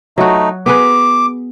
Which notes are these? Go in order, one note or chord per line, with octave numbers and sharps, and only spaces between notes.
F#3 A3 D#4 F#4
B3 G#4 B4 D6